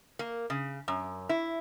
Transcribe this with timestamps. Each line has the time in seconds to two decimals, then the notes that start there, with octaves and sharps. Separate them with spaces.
0.19 A#3
0.50 C#3
0.88 F#2
1.29 E4